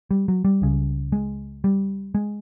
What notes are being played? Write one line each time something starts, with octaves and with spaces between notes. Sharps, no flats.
G3
F#3
G3
C#2 C#3
G#3
G3
G#3